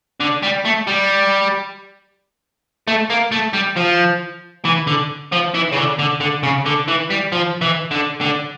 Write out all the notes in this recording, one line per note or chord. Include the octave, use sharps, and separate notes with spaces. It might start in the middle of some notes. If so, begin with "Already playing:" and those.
D3
G3
A3
G3
A3
A#3
A3
G3
F3
E3
D3
F3
E3
C#3
D3
D3
D3
C#3
D3
E3
G3
F3
E3
D3
D3